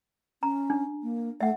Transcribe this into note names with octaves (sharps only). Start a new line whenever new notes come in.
C#4 A#5
D4
A#3
A3 E5 F#5